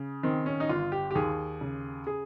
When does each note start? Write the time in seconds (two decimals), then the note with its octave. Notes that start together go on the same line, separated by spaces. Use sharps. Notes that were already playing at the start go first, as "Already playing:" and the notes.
Already playing: C#3
0.23 D#3 C4
0.46 C#4
0.60 D#4
0.69 G1 F4
0.92 G4
1.11 G4
1.15 D#2 G#4
1.61 C#3
2.07 G#4